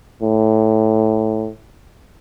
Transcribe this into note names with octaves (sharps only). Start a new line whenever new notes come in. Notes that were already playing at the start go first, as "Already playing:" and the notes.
A2